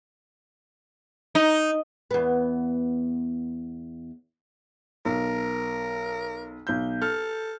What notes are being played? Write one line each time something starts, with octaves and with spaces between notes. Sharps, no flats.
D#4
E2 B3
B1 A#4
B1 G6
A4 F6